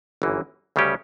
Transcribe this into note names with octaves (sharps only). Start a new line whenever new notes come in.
G1 F#2 E3 A#3
D2 C#3 G3 C#4 G4